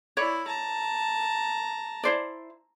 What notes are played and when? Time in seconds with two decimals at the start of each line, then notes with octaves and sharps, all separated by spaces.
0.17 E4 C#5 D5 B5
0.47 A5 A#5
2.03 E4 C5 D5